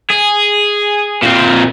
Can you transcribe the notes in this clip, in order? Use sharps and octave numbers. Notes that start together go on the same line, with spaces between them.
G#4
A#2 C4